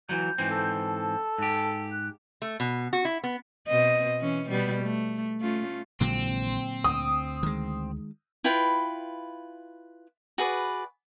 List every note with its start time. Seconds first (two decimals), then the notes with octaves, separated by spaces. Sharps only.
0.09 E3 F#3 G6
0.38 G#2 E3 C4
0.51 A4
0.87 A5
1.38 G#2 G4
1.92 F#6
2.42 A3
2.60 B2
2.93 F#4
3.05 E4
3.24 B3
3.68 B2 C4 D#5
4.20 E3 C#4
4.50 B2 G3 B3
4.82 A3
5.41 A3 C#4 F4
6.01 A#1 A#2 D3 E3 F#3 G#3 C4
6.84 D2 D#6
7.43 D#3 G#3
8.44 E4 F4 B4 G5
10.38 F#4 G#4 B4 D5